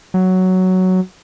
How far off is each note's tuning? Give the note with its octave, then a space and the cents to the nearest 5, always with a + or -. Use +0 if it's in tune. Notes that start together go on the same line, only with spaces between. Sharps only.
F#3 +5